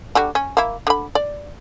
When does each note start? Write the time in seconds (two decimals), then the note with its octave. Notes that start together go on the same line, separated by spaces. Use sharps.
0.15 D3 G3 F#4
0.35 C#4
0.57 A#3 E4
0.87 D3 B5
1.15 D5